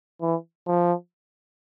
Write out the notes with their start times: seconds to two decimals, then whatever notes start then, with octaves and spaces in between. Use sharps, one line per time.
0.21 E3
0.66 F3